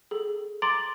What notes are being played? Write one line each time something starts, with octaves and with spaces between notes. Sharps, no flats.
G#4 A4
A#5 C6 D6 A6 D7 F#7